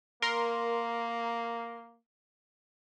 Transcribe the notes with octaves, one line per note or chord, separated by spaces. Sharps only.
A#3 A#4 C6